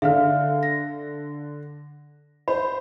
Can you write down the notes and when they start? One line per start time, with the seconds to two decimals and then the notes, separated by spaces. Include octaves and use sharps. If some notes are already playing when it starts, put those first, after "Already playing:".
0.02 D3 E5 F5 F6
0.63 A#6
2.48 C5 B5